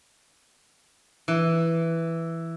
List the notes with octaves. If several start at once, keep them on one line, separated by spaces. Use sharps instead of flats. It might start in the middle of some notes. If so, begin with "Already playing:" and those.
E3